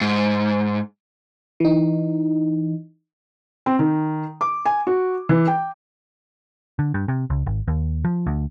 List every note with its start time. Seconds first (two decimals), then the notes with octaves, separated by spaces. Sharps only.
0.01 G#2
1.60 E3 D#4
3.66 C4
3.79 D#3
4.41 D6
4.65 G#5
4.87 F#4
5.29 E3
5.47 G5
6.79 D3
6.94 G2
7.08 C3
7.30 C#2
7.46 G#1
7.68 D#2
8.05 F3
8.26 D2